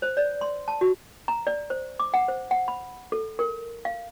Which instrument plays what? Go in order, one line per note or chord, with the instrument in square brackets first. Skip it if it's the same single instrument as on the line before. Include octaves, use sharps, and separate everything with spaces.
[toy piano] C5
D5
C6
A5
F#4
A#5
D5
C5
D6
F#5
C5
F#5
B5
A4
A#4
F5